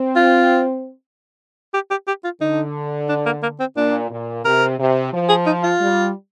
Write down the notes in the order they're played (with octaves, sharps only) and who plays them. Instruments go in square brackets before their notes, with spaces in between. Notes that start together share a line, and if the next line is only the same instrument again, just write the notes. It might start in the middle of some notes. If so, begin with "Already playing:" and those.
Already playing: [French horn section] C4
[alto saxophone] F4
G4
G4
G4
F4
[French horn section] D3 [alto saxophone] D#4
[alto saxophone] D4
A#3
A#3
C4
[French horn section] A#2 [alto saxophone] D4
[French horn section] A#2
[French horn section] C3 [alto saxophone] A#4
[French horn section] C3
F3
[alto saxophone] G#4
D#4
F4
[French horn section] G3